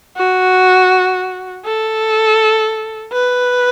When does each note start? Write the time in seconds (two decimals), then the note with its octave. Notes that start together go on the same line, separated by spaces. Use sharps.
0.17 F#4
1.65 A4
3.13 B4